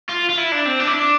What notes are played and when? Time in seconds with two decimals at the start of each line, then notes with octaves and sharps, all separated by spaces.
0.09 F4
0.29 F4
0.37 E4
0.52 D4
0.65 C4
0.80 D4
0.87 E4
0.94 D4